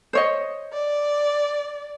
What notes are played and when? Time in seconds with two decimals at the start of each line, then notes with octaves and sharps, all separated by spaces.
0.13 C5 C#5 D#5
0.73 D5